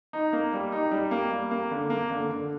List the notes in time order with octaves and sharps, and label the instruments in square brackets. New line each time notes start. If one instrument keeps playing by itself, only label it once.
[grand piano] D#4
A#3
G3
D#4
G3
A#3
G3
A#3
D3
A#3
D3
D3